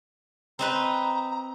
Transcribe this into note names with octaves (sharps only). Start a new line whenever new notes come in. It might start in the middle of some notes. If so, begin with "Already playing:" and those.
C4 D#4 B4 A#5